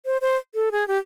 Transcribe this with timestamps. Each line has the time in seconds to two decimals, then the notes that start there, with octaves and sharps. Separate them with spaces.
0.06 C5
0.21 C5
0.55 A4
0.72 G#4
0.88 G4